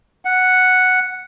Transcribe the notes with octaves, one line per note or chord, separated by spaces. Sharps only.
F#5